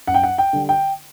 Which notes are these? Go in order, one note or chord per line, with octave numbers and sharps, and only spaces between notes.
F#2 F#5
G5
F#5
G5
D3 G3
G5